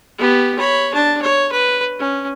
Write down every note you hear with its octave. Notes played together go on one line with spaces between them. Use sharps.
B3 G4
C#5 B5
D4 A5
C#5
B4
C#4